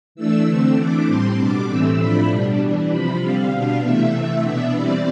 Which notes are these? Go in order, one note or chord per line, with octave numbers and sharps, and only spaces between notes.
E3 A3 D4 E6
D3 A3 C4 E6
E3 A3 D4 D6
A2 G3 C4 C6
B2 G3 D4 D6
A2 E3 A3 C4 E6
A2 F3 A3 D4 B5
B2 G3 D4
E3 G3 D4
C3 F3 C4 B5
D3 G3 C4 F5
B2 B3 D4 F5
C3 E3 A3 E5
C3 E3 A3
B2 B3 D4 E5
E3 G3 C4 D5